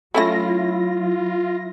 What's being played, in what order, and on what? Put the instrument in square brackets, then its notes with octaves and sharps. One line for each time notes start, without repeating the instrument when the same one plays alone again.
[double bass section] F#3 [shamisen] A3 C#4 A4 [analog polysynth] E4 A#6 [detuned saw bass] F4